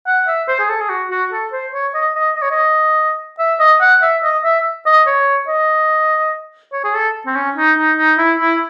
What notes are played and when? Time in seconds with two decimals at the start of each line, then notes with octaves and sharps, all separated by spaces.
0.07 F#5
0.28 E5
0.48 C5
0.60 G#4
0.69 A4
0.81 G#4
0.90 F#4
1.11 F#4
1.32 A4
1.52 C5
1.73 C#5
1.95 D#5
2.15 D#5
2.36 D#5
2.42 C#5
2.51 D#5
3.39 E5
3.60 D#5
3.81 F#5
4.02 E5
4.24 D#5
4.44 E5
4.86 D#5
5.07 C#5
5.48 D#5
6.73 C#5
6.84 G#4
6.94 A4
7.26 C4
7.36 C#4
7.57 D#4
7.78 D#4
7.98 D#4
8.18 E4
8.40 E4